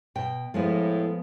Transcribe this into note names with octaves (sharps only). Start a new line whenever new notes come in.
B2 G5
A2 F3 G#3 B3